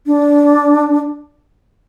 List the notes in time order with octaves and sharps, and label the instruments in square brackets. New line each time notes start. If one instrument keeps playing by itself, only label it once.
[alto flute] D4